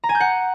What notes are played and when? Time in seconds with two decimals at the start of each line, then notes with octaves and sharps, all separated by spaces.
0.04 A#5
0.09 G#5
0.15 G6
0.20 F#5